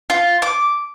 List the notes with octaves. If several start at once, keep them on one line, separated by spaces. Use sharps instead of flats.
F4
D6